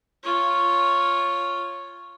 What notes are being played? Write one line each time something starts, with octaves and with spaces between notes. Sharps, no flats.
F4 C#5